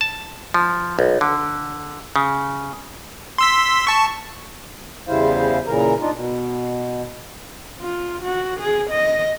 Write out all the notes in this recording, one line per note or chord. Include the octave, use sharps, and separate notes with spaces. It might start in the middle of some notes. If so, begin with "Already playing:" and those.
A5
F3
B1
D3
C#3
C6 E6 B6
A5 C#6
E2 C#3 G3 E4 C5 F5
A#2 C#3 E3 A#4 A#5
D4 D#4 F4
B2
F4
F#4
G#4
D#5